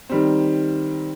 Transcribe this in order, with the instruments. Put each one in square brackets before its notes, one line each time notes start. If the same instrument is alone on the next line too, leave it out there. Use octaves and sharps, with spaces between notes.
[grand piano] D#3 G3 C4